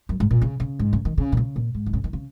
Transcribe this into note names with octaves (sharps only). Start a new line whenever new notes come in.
F#2
G#2
A#2
C#3
C#3
G#2
C#3
D#3
C#3
A#2
C#3
A#2
G#2
D#3
C#3
D#3
C#3